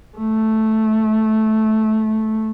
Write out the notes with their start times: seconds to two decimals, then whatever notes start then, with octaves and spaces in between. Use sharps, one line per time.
0.18 A3